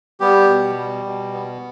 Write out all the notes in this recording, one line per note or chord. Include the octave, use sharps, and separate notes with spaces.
G3 B3 G4
B2
G3
B2
B3